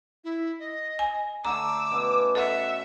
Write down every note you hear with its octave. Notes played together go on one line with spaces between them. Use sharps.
E4
D#5
G#5
D3 A3 A#5 D6 E6
B2 C#4
A4 E5 F#5